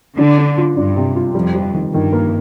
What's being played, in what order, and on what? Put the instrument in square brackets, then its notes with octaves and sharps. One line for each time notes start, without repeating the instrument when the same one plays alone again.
[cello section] D3 [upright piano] D4
[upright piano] D4
F4
[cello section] G2 [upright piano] D4
[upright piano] C3
F4
[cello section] F2 [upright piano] G3
[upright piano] G3
D#3
[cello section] G2 [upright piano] D#3
[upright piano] A#3